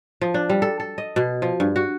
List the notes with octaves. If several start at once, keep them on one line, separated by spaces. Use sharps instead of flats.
F3
D4
G3
A4
A4
D#5
B2
F3
G2
F#4